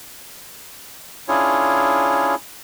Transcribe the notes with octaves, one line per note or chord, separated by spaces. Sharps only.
C#4 D4 E4 F4 G#4 C#5